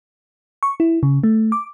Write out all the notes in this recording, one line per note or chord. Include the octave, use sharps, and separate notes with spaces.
C#6
E4
C#3
A3
D6